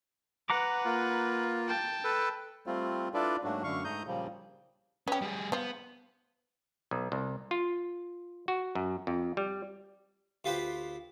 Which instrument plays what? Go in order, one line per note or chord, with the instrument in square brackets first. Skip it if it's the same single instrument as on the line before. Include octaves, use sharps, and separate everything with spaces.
[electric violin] B4 [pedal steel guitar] F#5 A#5 D6
[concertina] A#3 F4
[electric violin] G5 A5
[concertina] A4 B4
[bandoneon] G3 A3 C4 F4
D4 E4 F4 A4 B4 D5
G#2 F#3 A3 A#3 D4 F#4
F#2 D3 A3 F5 C#6
G#2 A3 A#5 D#6 G6
A#2 C#3 F3 G3 A#3
[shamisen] B3 G4 [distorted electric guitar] C#4
[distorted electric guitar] G3 G#4
[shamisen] F3 F4 [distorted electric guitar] B3
[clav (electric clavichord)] B1
C2
F4
F#4
F#2
F2
G3
[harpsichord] D2 F4 G4 B4 C5